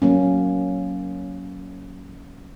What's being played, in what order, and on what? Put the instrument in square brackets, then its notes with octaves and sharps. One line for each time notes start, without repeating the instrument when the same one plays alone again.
[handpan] F#3 A#3 C#4